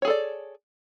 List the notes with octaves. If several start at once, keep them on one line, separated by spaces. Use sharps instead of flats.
G#4 A4 C#5 D5